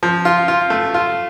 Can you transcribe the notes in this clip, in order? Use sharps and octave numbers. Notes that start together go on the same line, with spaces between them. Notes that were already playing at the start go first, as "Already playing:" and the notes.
F3
F4
F4
A3
F4